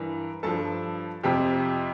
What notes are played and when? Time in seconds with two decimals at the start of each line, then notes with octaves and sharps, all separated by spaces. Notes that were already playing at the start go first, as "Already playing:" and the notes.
Already playing: G2 E3 A#4
0.43 G2 F3 A4 A5
1.23 F2 C3 F3 G4 G5